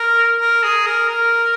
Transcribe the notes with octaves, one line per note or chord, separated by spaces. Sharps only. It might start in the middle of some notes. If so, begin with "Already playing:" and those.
Already playing: A#4
A#4
G#4
A#4
A#4